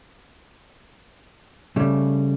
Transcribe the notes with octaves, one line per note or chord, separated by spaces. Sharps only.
C#3 G3 A3